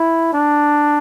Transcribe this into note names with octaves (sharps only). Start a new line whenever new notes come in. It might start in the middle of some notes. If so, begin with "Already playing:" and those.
Already playing: E4
D4